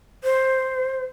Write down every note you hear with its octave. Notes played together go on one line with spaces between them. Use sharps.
C5